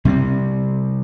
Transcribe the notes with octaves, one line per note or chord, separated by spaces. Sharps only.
C3 G3 B3 C4